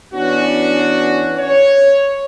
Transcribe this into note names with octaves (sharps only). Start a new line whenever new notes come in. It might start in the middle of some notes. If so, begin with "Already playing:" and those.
E3 B3 C#4 D4 F#4
C#5